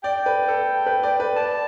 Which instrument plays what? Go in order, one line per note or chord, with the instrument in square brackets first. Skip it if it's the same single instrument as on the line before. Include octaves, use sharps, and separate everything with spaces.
[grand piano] D5 [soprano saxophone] G5
[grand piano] B4
A4
B4
D5
B4
[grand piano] D5 [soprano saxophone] A5